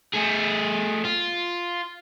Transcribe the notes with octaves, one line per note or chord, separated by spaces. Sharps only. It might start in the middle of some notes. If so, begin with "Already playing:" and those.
A3 G#4
F4